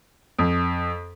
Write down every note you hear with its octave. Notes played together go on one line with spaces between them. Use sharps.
F2